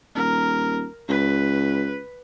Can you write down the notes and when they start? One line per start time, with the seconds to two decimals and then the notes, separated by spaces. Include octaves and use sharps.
0.15 D#1 A#4
1.09 C#2 B4